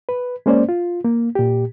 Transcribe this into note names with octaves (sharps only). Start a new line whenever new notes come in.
B4
G#3 A#3 C#4 C5 D5
F4
A#3
A#2 G4